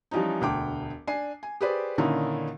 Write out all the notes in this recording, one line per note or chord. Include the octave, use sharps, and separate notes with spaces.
E3 F3 G3 C#4 D#4
E1 D2 G5 D6
D4 G#5 C7
G#5
G4 G#4 B4 C5 D5
A#2 D3 D#3 C#4 D#4 E4